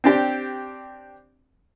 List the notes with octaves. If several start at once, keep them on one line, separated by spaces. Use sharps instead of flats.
C4 D4 G4